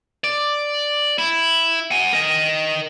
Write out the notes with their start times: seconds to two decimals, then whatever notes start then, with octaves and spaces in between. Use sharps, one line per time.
0.24 D5
1.18 E4
1.91 F#5 G#5
2.13 A#4 D#5